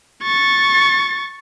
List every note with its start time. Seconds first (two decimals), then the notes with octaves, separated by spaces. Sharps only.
0.23 C#6 A6